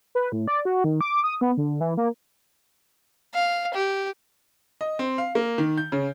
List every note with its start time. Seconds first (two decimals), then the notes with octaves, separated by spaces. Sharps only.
0.15 B4
0.32 A2
0.48 D5
0.65 F#4
0.84 D#3
1.01 D6
1.24 D#6
1.41 B3
1.57 D3
1.81 E3
1.97 A#3
3.34 F5
3.74 G4
4.81 D#5
4.99 C4
5.18 F5
5.35 A#3
5.58 D#3
5.78 G6
5.92 C#3